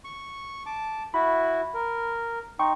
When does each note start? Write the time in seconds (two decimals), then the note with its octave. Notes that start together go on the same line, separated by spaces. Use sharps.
0.04 C#6
0.66 A5 D6
1.14 E4 F#4 B5
1.74 A#4
2.59 D#4 G5 C6 C#6